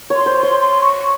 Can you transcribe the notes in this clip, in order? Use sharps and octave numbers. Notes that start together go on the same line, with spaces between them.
C#5
C6
C5
C6
C#5
C6
C#6